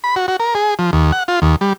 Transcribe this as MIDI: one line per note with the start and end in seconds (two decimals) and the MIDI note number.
0.04 0.15 83
0.16 0.26 66
0.28 0.36 66
0.40 0.54 70
0.55 0.74 68
0.79 0.91 53
0.93 1.12 39
1.12 1.23 78
1.28 1.40 65
1.42 1.56 39
1.61 1.73 55